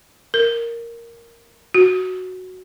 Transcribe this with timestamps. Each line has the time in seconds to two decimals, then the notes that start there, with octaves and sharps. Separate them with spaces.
0.34 A#4
1.74 F#4